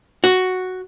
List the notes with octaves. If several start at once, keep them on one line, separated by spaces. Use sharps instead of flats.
F#4